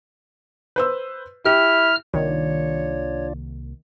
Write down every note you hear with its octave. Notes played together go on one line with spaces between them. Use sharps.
B4 C5 E6
E4 G4 F6
C2 D#3 A#3 D4 F4 C#5 D5